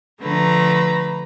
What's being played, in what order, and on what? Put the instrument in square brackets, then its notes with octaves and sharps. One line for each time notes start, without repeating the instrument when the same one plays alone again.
[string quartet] D3 F3 A3 B4 A#5